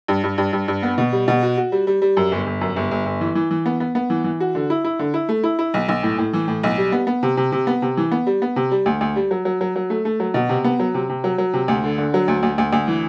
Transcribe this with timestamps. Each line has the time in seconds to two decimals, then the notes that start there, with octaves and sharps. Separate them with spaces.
0.08 G2
0.24 G2
0.38 G2
0.53 G2
0.68 G2
0.83 B3
0.98 B2
1.12 G3
1.28 B2
1.43 F#4
1.57 F#4
1.72 G3
1.87 G3
2.02 G3
2.17 F#2
2.32 G1
2.46 G1
2.61 F#2
2.76 G1
2.91 G1
3.06 G1
3.21 E3
3.35 E3
3.51 E3
3.66 B3
3.80 B3
3.95 B3
4.10 E3
4.24 E3
4.40 F#4
4.55 D3
4.70 E4
4.85 E4
4.99 D3
5.14 E4
5.29 A3
5.44 E4
5.59 E4
5.74 B1
5.88 B1
6.03 A2
6.18 A2
6.33 E3
6.48 A2
6.63 B1
6.78 G3
6.92 B3
7.07 B3
7.23 C3
7.37 C3
7.52 C3
7.67 B3
7.82 C3
7.97 E3
8.12 B3
8.27 G3
8.42 B3
8.56 C3
8.71 G3
8.86 D2
9.01 D2
9.16 G3
9.31 F#3
9.45 F#3
9.61 F#3
9.76 F#3
9.90 A3
10.05 A3
10.20 F#3
10.34 B2
10.49 C3
10.64 B3
10.80 F#3
10.94 C3
11.09 C3
11.24 F#3
11.38 F#3
11.53 C3
11.68 D2
11.84 D3
11.98 D3
12.14 F#3
12.28 D2
12.43 D2
12.58 D2
12.73 D2
12.88 E3